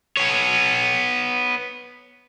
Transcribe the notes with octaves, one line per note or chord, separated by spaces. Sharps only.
B3 C#5